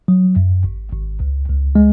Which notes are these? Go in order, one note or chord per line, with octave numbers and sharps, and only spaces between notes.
F#3
F#2
G#1
G#1
C#2
C#2
G#3